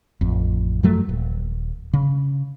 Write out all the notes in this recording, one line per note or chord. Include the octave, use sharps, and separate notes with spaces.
A1 F2
F#2 F3 F#3 A3
D#1
C#3